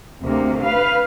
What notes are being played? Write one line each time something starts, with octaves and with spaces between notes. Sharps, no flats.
D2 C3 A#3
B4 F5